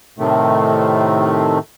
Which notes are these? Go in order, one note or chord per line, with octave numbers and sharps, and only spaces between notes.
A2 C3 D#3 A3